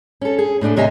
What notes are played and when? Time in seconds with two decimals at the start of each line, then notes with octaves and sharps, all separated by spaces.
0.21 C#4 A4
0.38 G#4
0.61 A2 A3 D4 G#4
0.76 D#2 C3 C#5 D#5 E5 G#5